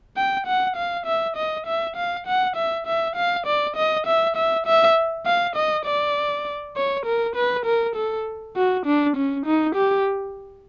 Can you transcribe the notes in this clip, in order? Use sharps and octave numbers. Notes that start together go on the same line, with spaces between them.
G5
F#5
F5
E5
D#5
E5
F5
F#5
E5
E5
F5
D5
D#5
E5
E5
E5
F5
D#5
D5
C#5
A#4
B4
A#4
A4
F#4
D4
C#4
D#4
G4